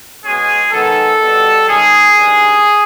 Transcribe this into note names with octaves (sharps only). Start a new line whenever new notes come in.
B2 G#3 C#4 G#4
D#3 G#3 B3 A4
B2 G3 B3
D#3 G#3 C#4 G#4
G2 D#3 G#3